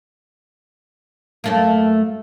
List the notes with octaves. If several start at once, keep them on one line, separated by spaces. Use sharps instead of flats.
F#2 A3 A#3